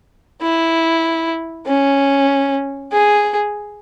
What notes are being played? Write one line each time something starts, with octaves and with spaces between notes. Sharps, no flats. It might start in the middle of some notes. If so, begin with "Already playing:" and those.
E4
C#4
G#4